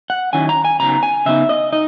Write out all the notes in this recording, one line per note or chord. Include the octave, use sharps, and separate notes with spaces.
F#5
D#3 F#3 C#4 E4 G#5
A#5
G#5
C#3 F#3 B3 D#4 A#5
G#5
C#3 F#3 B3 D#4 E5
D#5
D#4 D#5